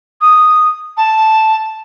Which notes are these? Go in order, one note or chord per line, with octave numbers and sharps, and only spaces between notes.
D#6
A5